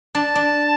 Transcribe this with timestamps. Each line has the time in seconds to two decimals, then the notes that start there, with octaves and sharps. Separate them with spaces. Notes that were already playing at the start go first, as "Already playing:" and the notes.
0.15 D4 A5
0.35 D4